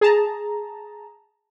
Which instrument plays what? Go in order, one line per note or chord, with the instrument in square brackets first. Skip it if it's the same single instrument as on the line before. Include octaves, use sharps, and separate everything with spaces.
[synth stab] G#4 A5 A#5